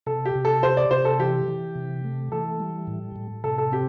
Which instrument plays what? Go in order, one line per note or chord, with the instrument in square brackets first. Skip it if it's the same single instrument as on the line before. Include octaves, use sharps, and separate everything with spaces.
[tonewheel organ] C3 [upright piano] A4
[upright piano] G4
[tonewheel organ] C3
[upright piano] A4
[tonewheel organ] G4 [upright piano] C5
[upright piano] D5
[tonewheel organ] C3 [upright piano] C5
[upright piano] A4
[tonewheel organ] E3 [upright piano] G4
[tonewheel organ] E3
C3
A3
[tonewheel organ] E3 [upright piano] A4
[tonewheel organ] G3
A2
A2
[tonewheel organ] C3 [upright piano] A4
[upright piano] A4
[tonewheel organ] C4 [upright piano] G4